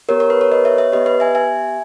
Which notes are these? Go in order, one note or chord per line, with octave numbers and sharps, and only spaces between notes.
B3 G4 A#4 C#5
A#4 C#5
B4
A#4 C#5
B4 D#5
C#5 E5
C#5 E5
B3 G4 B4 D#5
B4
E5 G#5
E5 G#5